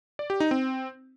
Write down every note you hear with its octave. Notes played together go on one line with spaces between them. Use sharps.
D5
G4
D#4
C4